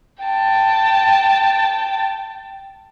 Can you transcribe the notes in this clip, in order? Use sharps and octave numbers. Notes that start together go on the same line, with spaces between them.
G5 A5